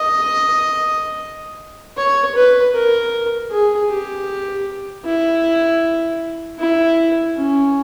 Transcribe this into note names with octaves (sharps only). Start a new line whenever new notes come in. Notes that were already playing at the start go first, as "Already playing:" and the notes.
Already playing: D#5
C#5
B4
A#4
G#4
G4
E4
E4
C#4